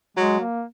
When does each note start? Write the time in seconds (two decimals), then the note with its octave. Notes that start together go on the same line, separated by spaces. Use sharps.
0.17 F#3 G#3
0.40 A#3